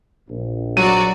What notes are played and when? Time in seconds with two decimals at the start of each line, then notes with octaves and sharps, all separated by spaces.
0.29 A#1
0.77 F#3 F#4 D5 D#7